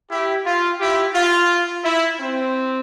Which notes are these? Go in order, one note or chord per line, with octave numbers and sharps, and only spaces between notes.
E4 G4
F4
E4 G4
F4
E4
C4